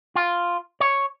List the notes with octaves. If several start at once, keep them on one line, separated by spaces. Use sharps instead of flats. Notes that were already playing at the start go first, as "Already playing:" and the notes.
F4
C#5